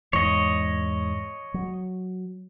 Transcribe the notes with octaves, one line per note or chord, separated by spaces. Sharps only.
E2 G#2 C#5 D#5
F#3